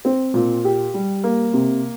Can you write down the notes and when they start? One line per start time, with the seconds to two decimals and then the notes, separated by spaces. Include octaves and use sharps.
0.05 C4
0.34 A#2
0.65 G4
0.94 G3
1.24 A#3
1.53 C3